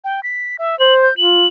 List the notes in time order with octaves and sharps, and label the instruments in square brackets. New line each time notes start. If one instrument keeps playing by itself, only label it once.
[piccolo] G5
B6
E5
[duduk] C5 [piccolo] F#7
[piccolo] G6
[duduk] F4 [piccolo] F#7